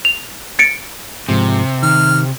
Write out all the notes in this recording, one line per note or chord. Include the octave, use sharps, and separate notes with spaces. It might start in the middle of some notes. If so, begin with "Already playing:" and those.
F7
A6 C#7 D7
G#2 C3 F3 G#3
D#3 F6